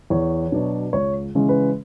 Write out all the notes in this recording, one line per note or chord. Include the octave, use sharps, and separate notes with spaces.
E2 C#5
B2 F#3 B3 D4
C#2 C#5
C#3 E3 G#3 C#4
B4